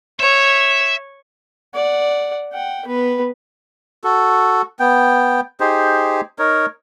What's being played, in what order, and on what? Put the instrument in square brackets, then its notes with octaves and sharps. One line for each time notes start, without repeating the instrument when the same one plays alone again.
[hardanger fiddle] C#5 [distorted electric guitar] E5
[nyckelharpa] D5 F#5
F#5 G5
B3 B4
[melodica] F#4 A4
B3 G5
D#4 G4 G#4 C5
D#4 A#4 C#5